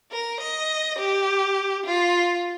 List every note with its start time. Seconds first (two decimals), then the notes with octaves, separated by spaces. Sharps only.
0.12 A#4
0.40 D#5
0.99 G4
1.86 F4